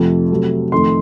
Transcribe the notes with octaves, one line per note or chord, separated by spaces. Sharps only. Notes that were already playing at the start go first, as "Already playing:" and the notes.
Already playing: F2 C3 F3 A3
C3 F#3 A3
F2 D#3 A3 C6